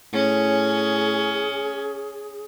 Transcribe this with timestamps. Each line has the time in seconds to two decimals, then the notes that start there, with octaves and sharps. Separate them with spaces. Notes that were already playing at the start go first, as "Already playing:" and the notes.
0.13 A2 C#4 G#4